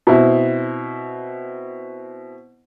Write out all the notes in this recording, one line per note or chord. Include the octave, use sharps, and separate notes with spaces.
B2 C4 E4